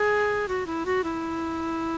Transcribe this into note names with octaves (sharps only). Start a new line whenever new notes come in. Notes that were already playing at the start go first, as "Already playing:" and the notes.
Already playing: G#4
F#4
E4
F#4
E4